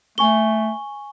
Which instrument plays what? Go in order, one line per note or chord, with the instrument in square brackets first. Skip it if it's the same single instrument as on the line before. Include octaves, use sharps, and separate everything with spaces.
[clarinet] A3 [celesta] G#5 C#6 G7